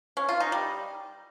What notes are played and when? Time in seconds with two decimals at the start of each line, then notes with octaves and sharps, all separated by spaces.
0.17 C#4
0.29 F4
0.40 D#4
0.52 G3